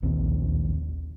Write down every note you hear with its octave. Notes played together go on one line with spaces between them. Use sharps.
D1 A#1 D#2 C4